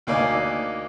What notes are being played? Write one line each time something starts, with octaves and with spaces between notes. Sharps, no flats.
D2 A#3 D#4 D5 G#5